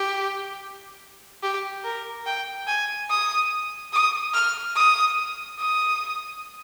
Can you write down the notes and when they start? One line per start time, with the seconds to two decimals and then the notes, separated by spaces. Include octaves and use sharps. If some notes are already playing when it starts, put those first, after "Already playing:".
Already playing: G4
1.43 G4
1.84 A#4
2.26 G5
2.67 G#5
3.10 D#6
3.93 D#6
4.34 F6
4.76 D#6
5.59 D#6